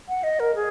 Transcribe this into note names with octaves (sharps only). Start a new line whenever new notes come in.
F#5
D#5
A#4
G#4